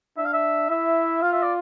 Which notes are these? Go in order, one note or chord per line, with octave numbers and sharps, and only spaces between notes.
D4 E5
F5
E5
E4 E5
F4 F5
E5
D5